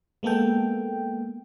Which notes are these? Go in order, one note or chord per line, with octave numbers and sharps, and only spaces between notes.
G#3 A#3 B3 A4 G5